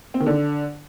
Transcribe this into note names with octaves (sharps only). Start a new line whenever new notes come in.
C4
D#3
D3